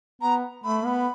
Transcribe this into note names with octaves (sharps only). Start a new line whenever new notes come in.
B3 A#5
A3 B5
B3